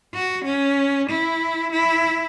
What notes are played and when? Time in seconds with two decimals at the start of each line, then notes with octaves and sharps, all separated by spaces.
0.14 F#4
0.45 C#4
1.10 E4
1.72 E4